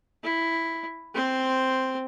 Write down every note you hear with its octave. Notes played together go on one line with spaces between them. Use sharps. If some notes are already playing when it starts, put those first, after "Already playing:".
E4
C4 C5